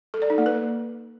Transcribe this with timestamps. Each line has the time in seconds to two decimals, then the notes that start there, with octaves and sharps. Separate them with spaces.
0.14 A4
0.22 D5
0.30 D#4
0.38 A#3
0.46 B4